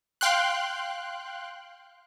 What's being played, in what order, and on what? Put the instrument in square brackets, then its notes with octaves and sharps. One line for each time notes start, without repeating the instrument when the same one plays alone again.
[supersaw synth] F5 G5 C6 F#6